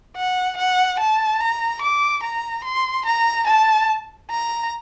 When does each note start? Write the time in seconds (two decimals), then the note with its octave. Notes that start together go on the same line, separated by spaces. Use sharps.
0.16 F#5
0.57 F#5
0.99 A5
1.40 A#5
1.82 D6
2.23 A#5
2.64 C6
3.05 A#5
3.47 A5
4.30 A#5